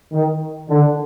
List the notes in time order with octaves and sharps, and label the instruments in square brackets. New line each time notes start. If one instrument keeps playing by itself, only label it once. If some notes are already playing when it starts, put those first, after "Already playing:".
[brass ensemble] D#3
D3